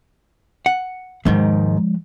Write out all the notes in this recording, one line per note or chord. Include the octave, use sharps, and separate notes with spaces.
F#5
D#2 G#2 D#3 F3 G#3